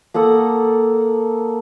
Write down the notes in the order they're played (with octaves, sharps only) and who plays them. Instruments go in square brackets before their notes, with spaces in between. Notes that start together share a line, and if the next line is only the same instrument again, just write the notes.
[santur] A#3 A4 F#5 D#6